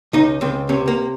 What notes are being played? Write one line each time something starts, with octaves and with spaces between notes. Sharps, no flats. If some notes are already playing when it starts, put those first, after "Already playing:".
C#2 D#4
C#2 C4
C3 C#4
A#3